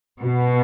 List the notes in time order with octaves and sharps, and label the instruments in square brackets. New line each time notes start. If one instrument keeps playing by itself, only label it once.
[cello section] B2